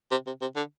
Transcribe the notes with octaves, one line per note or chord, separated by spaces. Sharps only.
C3
C3
C3
D3